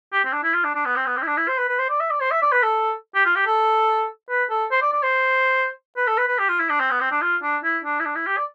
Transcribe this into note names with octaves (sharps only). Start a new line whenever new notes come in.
G4
C4
D4
E4
F4
D4
D4
B3
C4
B3
C4
E4
D4
E4
C5
B4
B4
C5
D5
E5
D5
C5
E5
D5
B4
A4
G4
F4
G4
A4
B4
A4
C5
D5
D5
C5
B4
A4
B4
B4
G4
F4
E4
D4
C4
B3
C4
D4
F4
D4
E4
D4
E4
D4
E4
G4
D5